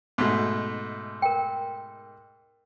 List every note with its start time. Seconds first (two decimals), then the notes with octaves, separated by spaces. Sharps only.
0.18 G#2 B2 A3
1.22 A#4 G5